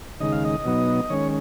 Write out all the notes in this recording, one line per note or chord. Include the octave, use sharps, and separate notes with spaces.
D#2 C#3 G#3 D#4 D#5
F5
D#5
B2 F#3 B3 D#4
D#3 G#3 C#4 C#5